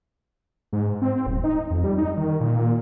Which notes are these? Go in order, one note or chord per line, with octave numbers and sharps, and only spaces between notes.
G#2
C4
D#1
D#4
F2
G3
D#4
D#3
A#2